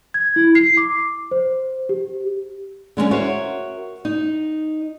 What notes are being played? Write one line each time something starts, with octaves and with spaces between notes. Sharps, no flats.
G#6
E4
C7
D6
C5
G4
D3 G#3 A3 C#4
F#4 A#4 C5 C#5 E5 F5
D#4